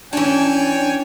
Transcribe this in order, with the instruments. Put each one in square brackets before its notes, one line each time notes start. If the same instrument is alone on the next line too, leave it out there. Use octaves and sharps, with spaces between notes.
[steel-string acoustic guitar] E3 D4 [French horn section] C#4 [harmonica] C#5 G5 G#5